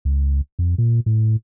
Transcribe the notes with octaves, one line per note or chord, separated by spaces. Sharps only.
C#2
F2
A#2
A2